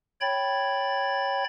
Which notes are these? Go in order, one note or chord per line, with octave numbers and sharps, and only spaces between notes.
C#5 G5 B5 G#6 A6